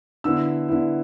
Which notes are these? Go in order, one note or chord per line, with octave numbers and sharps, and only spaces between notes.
D3 B3 E4 E6
D3 B3 E4